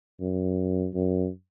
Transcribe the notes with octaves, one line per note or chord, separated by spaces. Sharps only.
F#2
F#2